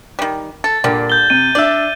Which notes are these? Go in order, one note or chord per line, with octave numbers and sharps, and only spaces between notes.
D#3 G3
A4 A6
A#2 D3 G3 A#3
G6 G7
C3 D#7
D4 D5 E5